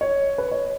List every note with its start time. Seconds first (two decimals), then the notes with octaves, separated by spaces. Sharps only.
0.01 C#5
0.38 B4
0.51 C#5